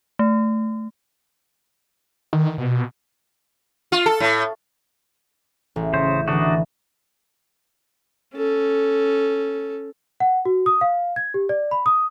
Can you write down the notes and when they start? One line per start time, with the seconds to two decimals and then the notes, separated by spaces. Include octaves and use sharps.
0.19 A3
2.33 D#3
2.58 B2
3.92 F4
4.06 A4
4.20 A2
5.76 A1
5.93 C#3 C5
6.28 D3 E3 D4 D#4 F#4
8.35 C#4 A4
10.20 F#5
10.45 F#4
10.66 D#6
10.81 F5
11.16 G#6
11.34 G4
11.49 D5
11.71 B5
11.86 D#6